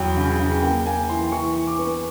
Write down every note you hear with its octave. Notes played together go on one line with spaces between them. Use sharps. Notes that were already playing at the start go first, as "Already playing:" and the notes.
Already playing: E2 F#3 G5
C#3
G#5
C#3
A#3 G5
A#3 G#5
E3 C6
E3 C#6
E3
D6
B3